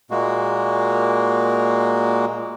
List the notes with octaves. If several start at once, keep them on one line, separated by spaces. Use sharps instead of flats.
A#2 G#3 A#3 F#4